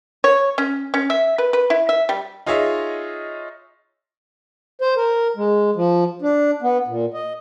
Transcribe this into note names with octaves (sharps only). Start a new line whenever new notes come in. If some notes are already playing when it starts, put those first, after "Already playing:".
C#5
C#4
C#4
E5
B4
B4
E4
E5
G3
D#4 F4 G#4 C#5 D#5 E5
C5
A#4
G#3
F3
D4
B3
A#2
D#5